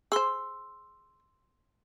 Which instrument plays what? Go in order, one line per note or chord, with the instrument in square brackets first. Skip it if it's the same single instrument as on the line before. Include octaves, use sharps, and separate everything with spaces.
[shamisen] G#4 C5 [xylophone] C6 E6